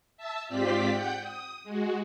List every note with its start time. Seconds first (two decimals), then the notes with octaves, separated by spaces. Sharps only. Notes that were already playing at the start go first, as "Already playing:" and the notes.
0.17 E5 A5 E6
0.48 G#2 C4 F4 G4 D5 B6
0.90 F#5 G5 G6
1.20 D#6
1.64 G#3 F#4